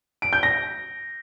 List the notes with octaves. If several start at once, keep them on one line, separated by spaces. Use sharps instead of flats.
D7
G6
A#6